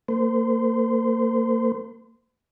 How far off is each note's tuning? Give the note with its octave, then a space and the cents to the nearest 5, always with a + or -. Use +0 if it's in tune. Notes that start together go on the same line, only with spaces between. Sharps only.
A#3 -35 C5 -30